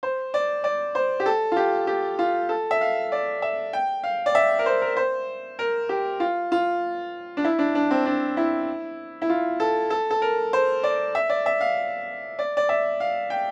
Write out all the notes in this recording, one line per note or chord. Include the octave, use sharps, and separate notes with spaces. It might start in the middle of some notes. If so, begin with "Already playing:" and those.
C5
D5
D5
C5
G4
A4
F4
G4
G4
F4
A4
E5
F5
D5
E5
G5
F5
D5
E5
A#4
C5
A#4
C5
A#4
G4
F4
F4
D4
E4
D4
D4
C4
D4
E4
E4
F4
A4
A4
A4
A#4
C5
D5
E5
D5
E5
F5
D5
D5
E5
F5
G5